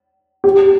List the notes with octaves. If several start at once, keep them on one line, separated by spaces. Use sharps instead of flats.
G4